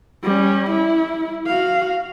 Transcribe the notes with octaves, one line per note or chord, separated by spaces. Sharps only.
G3 C#4
E4
F#4 F5